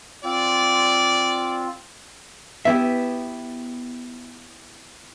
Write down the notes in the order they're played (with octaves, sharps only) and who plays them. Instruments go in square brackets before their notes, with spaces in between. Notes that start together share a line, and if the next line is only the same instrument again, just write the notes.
[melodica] C4 F4 [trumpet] D5
[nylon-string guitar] B3 E4 G4 [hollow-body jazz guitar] E5